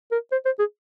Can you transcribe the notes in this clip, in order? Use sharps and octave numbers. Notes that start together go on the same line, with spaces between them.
A#4
C5
C5
G#4